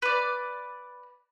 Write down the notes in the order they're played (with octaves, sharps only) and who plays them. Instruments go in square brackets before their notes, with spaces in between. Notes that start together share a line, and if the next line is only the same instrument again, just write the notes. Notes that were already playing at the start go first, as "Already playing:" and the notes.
[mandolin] B4 D5